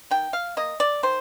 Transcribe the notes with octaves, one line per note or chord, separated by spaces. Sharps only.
D#3 G5
F5
A#3 D#5
D5
D#3 C5